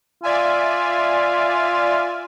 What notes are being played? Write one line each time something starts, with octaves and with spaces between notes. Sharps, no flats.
F4 D5 E5 G#5